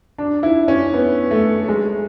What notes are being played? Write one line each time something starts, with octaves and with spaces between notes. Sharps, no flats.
D4
E4
C#4
B3
A3
G#3